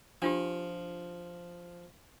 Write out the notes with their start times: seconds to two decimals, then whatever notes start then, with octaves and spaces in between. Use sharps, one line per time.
0.22 F3 D4 F4 G4